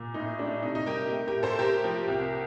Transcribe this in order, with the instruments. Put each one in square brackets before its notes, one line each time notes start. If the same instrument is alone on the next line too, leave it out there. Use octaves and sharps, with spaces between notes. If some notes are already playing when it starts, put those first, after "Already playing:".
Already playing: [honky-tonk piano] A#2
A2 D#4
A3 D4
C3 D#4
D#4
G3 G4 A#4
A3
G4 A#4
A2
A4 C5
A2 G4 A#4
F3
C2